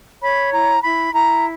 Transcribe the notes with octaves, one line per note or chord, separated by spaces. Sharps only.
C#5 B5
E4 A#5
E4 B5
E4 A#5